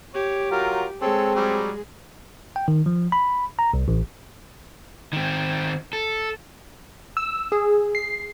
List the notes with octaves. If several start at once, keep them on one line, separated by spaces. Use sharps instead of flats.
G4 C#5
F#3 F4 A#4
G#3 C4 G#4 A4 C#5
F#3 G3
G5
D#3
F3
B5
A#5
C2
A1
D#3 C4
A4
E6
G#4
C7